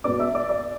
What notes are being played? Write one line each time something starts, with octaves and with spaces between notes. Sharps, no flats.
B2 B3 D5 D6
E5 E6
D5 D6
D5 D6